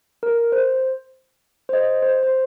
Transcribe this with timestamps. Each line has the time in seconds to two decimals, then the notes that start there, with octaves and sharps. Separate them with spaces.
0.23 A#4
0.52 C5
1.69 C5
1.73 D#5
2.02 C5
2.23 C5